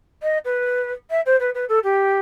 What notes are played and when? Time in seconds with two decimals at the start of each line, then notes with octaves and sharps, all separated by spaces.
0.23 D#5
0.45 B4
1.10 E5
1.26 C5
1.40 B4
1.55 B4
1.69 A4
1.84 G4